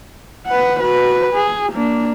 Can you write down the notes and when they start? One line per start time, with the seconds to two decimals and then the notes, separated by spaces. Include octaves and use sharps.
0.46 B4 F#5
0.80 F#4 B4
1.33 G#4
1.73 A#3 D4